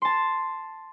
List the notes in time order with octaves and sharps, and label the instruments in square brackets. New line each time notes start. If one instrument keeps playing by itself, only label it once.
[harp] A5 C6